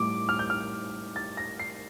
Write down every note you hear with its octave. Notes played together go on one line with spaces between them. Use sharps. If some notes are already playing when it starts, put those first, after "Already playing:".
Already playing: A2 G3 D6
F6
G6
F6
A6
A#6
C7